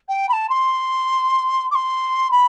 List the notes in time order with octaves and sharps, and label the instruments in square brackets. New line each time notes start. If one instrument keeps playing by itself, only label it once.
[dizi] G5
B5
A5
C6
D6
C6
B5